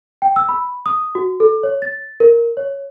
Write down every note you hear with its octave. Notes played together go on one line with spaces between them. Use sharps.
G5
E6
B5
D#6
F#4
A4
C#5
A6
A#4
C#5